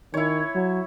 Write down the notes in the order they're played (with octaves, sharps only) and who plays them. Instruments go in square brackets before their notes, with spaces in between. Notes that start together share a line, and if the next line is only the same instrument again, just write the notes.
[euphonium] D#3 [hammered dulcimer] E4 C#5
[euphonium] F#3